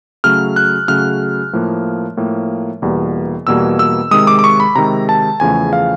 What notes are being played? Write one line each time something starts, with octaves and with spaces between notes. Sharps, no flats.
C#3 F#3 A3 F6
F#6
C#3 F#3 A3 F6
A2 F3 A#3
A2 F3 A#3
E2 B2 G3 A#3
E2 B2 G3 A#3 E6
E6
C3 D#3 G#3 D#6
D6
D6
C#6
B5
C3 D#3 G#3 A#5
A5
E2 C#3 F3 A3 G#5
F5